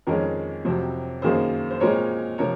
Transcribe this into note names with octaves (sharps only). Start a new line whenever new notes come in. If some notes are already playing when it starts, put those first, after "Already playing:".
F2 D#3 G#3 C#4 A#4
F2 C3 F#3 C4
F#2 D#3 A#3 G#4 C5
C5
A#2 G#3 C4 A#4 C#5
C3 F3 A#4 C#5